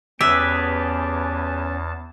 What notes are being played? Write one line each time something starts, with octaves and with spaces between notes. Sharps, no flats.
E2 B3 C#4 G4 G#4 B4 E5 A5